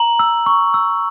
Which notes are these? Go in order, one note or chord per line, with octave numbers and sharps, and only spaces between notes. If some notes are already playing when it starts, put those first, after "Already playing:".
Already playing: A#5 F#7
E6
C#6
E6